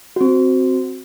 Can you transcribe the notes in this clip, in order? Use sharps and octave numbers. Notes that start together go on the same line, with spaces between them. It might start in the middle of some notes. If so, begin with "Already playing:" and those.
C4 F#4